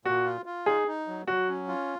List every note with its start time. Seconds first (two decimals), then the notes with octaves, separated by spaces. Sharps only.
0.05 A#2 F#4
0.25 F4
0.46 F4
0.66 D#4 G#4
0.88 D#4
1.08 F#3
1.27 F#3 F#4
1.49 C#4
1.68 F4